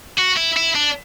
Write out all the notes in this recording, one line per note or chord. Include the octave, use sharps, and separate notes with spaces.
F#4
E4
E4
D4